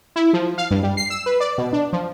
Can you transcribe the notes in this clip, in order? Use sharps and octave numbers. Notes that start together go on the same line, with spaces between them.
E4
F3
F5
G2
G3
C7
E6
B4
D5
B2
D4
F3